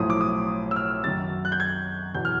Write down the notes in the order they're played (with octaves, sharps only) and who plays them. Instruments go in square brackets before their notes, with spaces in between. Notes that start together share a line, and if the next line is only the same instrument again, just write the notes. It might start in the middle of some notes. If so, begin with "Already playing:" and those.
Already playing: [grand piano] B1 A2 F3 D#6
D6
D#6
E6
F6
F#2 D#3 F#3 A6
F#6
G6
G#6
E2 B2 F#3 G6
F6